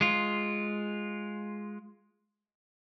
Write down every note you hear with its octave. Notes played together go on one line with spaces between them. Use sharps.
G#3 F4